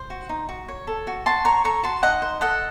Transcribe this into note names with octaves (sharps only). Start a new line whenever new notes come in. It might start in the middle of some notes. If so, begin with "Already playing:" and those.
Already playing: C5
F#4
D#4
F#4
C#5
A4
F#4
F#4 A5 C6
C#5 A#5 C#6
A4 A#5 C#6
F#4 A5 C6
D#4 D#5 F#5
C5
A4 D#5 F#5